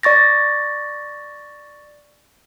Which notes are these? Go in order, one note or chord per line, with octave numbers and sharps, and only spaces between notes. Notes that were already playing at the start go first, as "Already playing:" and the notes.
D5 C#6 A6 A#6